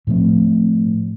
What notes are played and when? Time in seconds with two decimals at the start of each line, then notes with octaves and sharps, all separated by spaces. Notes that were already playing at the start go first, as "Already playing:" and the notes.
0.07 A2 F3 A3 C4